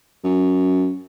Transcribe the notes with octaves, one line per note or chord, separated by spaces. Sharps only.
F#2